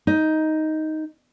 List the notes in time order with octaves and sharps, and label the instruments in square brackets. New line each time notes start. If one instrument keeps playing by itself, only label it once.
[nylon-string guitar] D#4